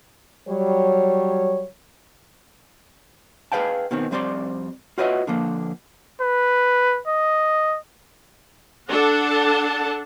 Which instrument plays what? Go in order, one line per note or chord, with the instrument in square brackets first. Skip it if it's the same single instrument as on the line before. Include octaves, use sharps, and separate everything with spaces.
[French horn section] F#3 G3 C#5
[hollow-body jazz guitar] G#4 B4 F5 G5 A5
B2 D#3 C4
F2 G3 C4 C5 D5 C6
F4 F#4 B4 C#5 D#5 E5
D3 F3 A#3
[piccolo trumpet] B4
D#5
[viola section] D4 A4 F#5 A5